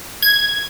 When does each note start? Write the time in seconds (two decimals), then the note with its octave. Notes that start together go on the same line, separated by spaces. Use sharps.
0.22 G#6